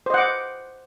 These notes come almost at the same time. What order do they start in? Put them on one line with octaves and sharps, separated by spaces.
C5 D#5 F#5 D6